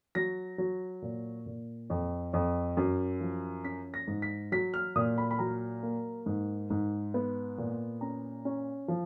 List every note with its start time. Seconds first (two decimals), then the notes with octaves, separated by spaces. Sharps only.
0.15 F#3 A#6
0.58 F#3
1.02 A#2
1.46 A#2
1.90 F2
2.33 F2
2.77 F#2
3.21 F3
3.64 C#4 B6
3.94 A#6
4.08 G#2
4.22 B6
4.52 F#3 B6
4.74 F6
4.96 A#2 D#6
5.18 B5
5.31 B5
5.39 F#3 A#5
5.83 A#3
6.26 G#2
6.70 G#2
7.14 B3
7.58 A#2
8.01 C#4 A#5
8.45 C#4
8.88 F3